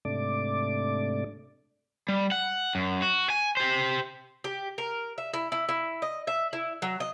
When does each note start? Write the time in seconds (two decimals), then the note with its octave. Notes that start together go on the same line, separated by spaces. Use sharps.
0.05 G#2 C3 A3 D4 D5 D6
2.08 G3
2.32 F#5
2.75 F#2
3.02 F#4
3.30 G#5
3.57 G4 C5
4.44 G4
4.78 A#4
5.18 E5
5.33 E4
5.52 E4
5.69 E4
6.02 D#5
6.27 E5
6.53 E4
6.82 F#3
7.00 D#5